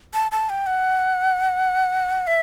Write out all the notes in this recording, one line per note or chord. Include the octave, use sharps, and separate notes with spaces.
A5
A5
G5
F#5
E5